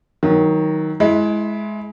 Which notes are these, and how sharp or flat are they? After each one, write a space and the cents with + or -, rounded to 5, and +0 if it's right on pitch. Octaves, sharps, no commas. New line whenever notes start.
D#3 +10 F#3 +0
G#3 +20 E4 +0